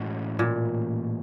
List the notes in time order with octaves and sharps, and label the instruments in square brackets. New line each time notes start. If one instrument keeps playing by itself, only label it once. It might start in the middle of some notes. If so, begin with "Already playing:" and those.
Already playing: [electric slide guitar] A2 E3 G#3 C#4 F#4
[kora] A#2